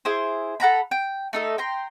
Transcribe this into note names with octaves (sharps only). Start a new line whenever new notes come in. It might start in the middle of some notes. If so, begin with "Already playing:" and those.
E4 G#4 C5
A4 F#5 A#5 B5
G5
A3 D#4 A4
G5 A#5 C6